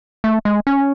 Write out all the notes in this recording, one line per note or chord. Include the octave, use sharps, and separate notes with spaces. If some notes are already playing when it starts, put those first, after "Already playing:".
A3
G#3
C#4